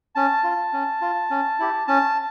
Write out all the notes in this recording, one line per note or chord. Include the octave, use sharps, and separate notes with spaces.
C#4 A5
F4
C#4
F4
C#4
E4 G4
C#4 A5